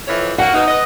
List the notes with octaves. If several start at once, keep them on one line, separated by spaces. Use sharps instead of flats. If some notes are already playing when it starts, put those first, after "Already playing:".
F2 E3 C#5
A#3 F#4 F#5
B2 D#4
B4 D#5